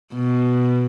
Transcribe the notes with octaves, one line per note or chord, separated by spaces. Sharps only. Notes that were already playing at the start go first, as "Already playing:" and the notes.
B2